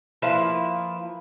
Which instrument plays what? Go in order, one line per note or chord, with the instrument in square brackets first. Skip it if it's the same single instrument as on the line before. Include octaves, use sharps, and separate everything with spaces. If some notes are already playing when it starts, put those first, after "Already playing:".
[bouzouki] F3 A#3 E4 B4